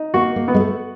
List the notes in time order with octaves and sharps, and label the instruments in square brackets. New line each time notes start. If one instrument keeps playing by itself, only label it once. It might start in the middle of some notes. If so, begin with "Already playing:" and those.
Already playing: [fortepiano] D#4
[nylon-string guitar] A#3 [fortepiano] F#4
[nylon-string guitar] A#3
[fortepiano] B3
[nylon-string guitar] G#3
A3